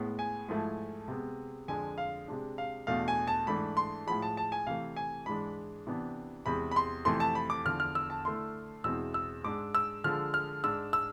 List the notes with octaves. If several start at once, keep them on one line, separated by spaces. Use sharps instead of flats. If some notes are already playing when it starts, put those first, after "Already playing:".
Already playing: A2 G#3 B3
G#5
G#2 F3 A3 E4
C3 G#3 B3
F2 D3 G#3 D4 G#5
F5
C3 G#3 D4
F5
E2 B2 A3 D4 F5
G#5
A5
G#2 E3 A3 D4 B5
C6
A2 F3 G#3 B5
A5
A5
G#5
C3 E3 A3 F5
G#5
G#2 E3 G#3 D4 B5
C3 E3 B3 D4
E2 C3 G#3 B5
B5
C6
F2 C3 E3 A3 C6
A5
B5
D6
E2 D3 F3 F6
F6
E6
A5
D3 A3 E4 C6
E2 B2 G#3 C4 E4 E6
E6
G#2 G#3 D4 D6
E6
D3 F3 G#3 F6
F6
G#2 G#3 D4 E6
E6